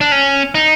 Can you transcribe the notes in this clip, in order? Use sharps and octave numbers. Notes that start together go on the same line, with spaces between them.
D4
C#4
D#4